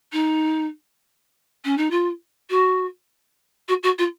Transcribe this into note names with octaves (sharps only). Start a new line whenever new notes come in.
D#4
C#4
D#4
F4
F#4
F#4
F#4
F4